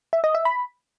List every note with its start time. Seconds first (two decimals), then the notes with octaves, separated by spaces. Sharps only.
0.13 E5
0.24 D#5
0.35 E5
0.45 B5